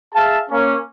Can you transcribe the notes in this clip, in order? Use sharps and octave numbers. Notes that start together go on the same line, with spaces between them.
G#4 E5 F5 A5
A#3 C#4